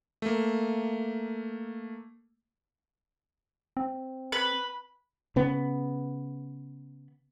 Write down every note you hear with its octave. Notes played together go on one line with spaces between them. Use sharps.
A3 A#3
C4
B4
C#3 B3